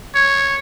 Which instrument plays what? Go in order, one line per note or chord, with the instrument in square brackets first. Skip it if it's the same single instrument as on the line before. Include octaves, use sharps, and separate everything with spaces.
[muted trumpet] C#5